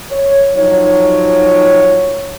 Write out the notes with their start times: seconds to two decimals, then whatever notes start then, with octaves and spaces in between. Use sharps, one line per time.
0.11 C#5
0.55 F3 F#3 D#4 C#5